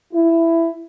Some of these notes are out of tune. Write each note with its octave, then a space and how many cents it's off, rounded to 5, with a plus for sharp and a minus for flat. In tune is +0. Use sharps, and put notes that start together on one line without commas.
E4 +10